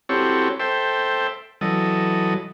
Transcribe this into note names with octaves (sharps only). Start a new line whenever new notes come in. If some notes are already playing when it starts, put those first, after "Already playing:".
C4 E4 F#4 G4 A4 C#5
A4 C5 E5 G5
E3 F#3 A4 D#5